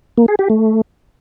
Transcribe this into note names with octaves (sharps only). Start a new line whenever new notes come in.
A#3
G#4
G4
A3